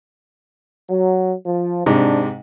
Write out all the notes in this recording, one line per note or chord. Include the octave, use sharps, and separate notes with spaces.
F#3
F3
G#2 C3 D4